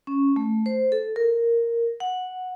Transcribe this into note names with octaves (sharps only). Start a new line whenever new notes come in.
C#4
A3
C5
A4
A#4
F#5